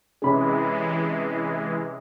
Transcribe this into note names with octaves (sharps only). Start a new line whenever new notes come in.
C3 E3 G#3 C#4 G#4 B5